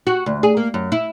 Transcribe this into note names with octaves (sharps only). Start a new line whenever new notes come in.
F#4
D2
G#4
A#3
F#2
E4